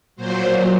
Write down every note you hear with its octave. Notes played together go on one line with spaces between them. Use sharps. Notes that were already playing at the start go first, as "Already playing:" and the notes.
A#2 F#3 C5